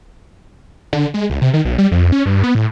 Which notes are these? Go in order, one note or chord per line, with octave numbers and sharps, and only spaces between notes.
D3
G#3
C#2
C3
D#3
B1
G3
F2
C#4
G2
B3
A2